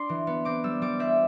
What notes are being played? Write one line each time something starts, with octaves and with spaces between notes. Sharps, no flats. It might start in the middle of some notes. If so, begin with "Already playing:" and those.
Already playing: D4 C6 D6
E3
B3
C4 D6
G3 E6
G3 D6
C4 E5